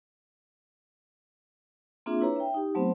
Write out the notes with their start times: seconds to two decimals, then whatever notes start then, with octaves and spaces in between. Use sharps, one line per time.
2.06 A#3 C4 D4 F4 G#4 E5
2.20 D4 E4 B4 C#5 A#5
2.36 E5 G5
2.54 D#4 G4
2.75 F#3 A3 B3 C4 C5